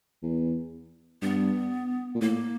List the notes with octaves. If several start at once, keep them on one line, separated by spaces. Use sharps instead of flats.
E2
G2 B3
A#2
A2 A#3